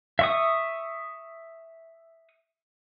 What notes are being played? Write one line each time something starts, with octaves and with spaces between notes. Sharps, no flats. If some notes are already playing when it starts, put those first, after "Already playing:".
E5 C#6 D#6